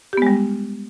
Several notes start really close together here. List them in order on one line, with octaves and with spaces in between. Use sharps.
G4 B3 G#3 G3